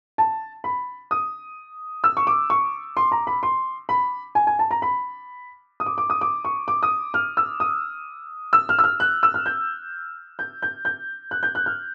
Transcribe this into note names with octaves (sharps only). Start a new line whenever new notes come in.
A5
B5
D#6
E6
C#6
D6
C#6
C6
A#5
B5
C6
B5
G#5
G#5
A5
A#5
B5
D#6
D6
D6
D#6
D6
C#6
D6
D#6
F6
E6
D#6
E6
F6
E6
F6
F#6
E6
F6
G6
G6
G6
G6
F#6
G6
F#6
F6